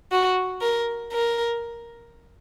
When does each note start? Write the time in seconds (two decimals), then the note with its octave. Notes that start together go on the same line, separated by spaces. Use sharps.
0.12 F#4
0.62 A#4
1.12 A#4